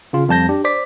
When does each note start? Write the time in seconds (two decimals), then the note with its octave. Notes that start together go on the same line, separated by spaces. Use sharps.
0.13 C#3 F4
0.29 F2 G3 A5 G6 A#6
0.49 D4 G4
0.64 C5 D5 D6 B6